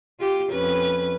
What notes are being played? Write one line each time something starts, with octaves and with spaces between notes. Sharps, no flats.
F4 G4
F2 C#4 B4